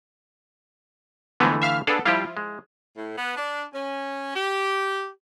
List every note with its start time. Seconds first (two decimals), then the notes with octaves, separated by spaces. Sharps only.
1.40 F2 D3 E3 G#3 A3 B3
1.62 E5 F5 F6
1.87 B3 D4 G#4 A4 F5
2.05 F3 G3 E4 F4 G4
2.37 G#3
2.96 A2
3.17 B3
3.36 D4
3.74 C#4
4.36 G4